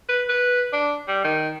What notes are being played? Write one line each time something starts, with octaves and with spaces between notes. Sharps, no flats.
B4
B4
D4
G3
D#3